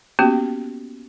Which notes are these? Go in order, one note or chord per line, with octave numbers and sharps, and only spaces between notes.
A#3 B3 C#4 F#4 G4